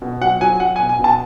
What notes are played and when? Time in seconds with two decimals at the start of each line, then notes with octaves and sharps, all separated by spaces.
0.02 B2
0.21 F#3 F#5
0.41 F#3 G#5
0.60 F#3 F#5
0.76 G#5
0.79 B2
0.89 G#5
0.99 B2 A5